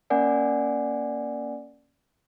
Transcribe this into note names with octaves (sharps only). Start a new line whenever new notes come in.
A#3 C#4 A#4 D5 F#5 G#5